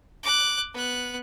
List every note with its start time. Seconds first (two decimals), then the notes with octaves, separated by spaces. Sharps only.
0.23 D6 F#6
0.73 B3 F#6